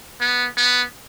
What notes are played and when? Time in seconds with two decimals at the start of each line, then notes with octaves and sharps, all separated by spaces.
0.21 B3
0.57 B3